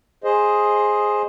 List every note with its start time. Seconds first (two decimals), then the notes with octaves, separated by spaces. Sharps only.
0.24 G#4 C5 D#5